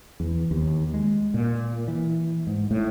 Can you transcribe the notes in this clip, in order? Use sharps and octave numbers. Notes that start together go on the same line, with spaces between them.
E2
D#2
G#3
A#2
E3
G#2
A2